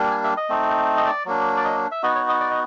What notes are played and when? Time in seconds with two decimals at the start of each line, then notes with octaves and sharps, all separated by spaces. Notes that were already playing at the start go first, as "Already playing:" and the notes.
Already playing: G3 A#3 D4
0.11 G#5
0.24 E5
0.37 D#5
0.50 A3 C4 D#4
0.97 D#5
1.06 D5
1.25 F#3 A#3 D4
1.57 D5
1.65 D#5
1.91 E5
2.03 B3 D#4 F#4 D#5
2.15 C#5
2.29 D#5
2.40 D5
2.51 D#5